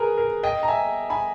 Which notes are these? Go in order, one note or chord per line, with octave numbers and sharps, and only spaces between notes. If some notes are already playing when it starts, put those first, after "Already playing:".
Already playing: G#4 A#4 B4
A#4
D#5 G5
A#5
E5 G#5
G#5 B5